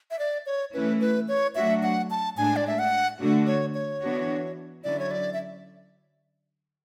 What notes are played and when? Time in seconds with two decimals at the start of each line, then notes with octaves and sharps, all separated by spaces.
0.11 E5
0.19 D5
0.46 C#5
0.73 E3 A3 C#4 E4 B4
1.01 B4
1.28 C#5
1.55 F#3 A3 D4 F#4 E5
1.83 F#5
2.11 A5
2.37 A2 G#3 D4 G#5
2.56 D5
2.67 E5
2.79 F#5
3.19 D3 A3 D4 F#4
3.47 C#5
3.74 C#5
4.02 E3 B3 D4 F#4
4.83 D3 F#3 C#4 E4 D5
4.99 C#5
5.11 D5
5.33 E5